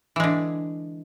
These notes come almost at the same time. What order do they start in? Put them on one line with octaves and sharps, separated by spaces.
E3 G#3 D3